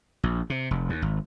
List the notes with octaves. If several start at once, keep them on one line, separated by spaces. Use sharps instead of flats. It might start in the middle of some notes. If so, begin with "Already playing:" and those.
A#1
C3
F1
D#2
G#1